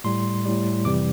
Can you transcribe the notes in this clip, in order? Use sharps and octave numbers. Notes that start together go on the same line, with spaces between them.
A2 G3 C6
A2 G3
F2 C3 E3 G3 D6